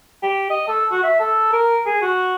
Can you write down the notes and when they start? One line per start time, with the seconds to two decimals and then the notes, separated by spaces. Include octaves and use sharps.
0.22 G4
0.50 D#5
0.68 A4
0.91 F#4
1.03 E5
1.19 A4
1.52 A#4
1.86 G#4
2.01 F#4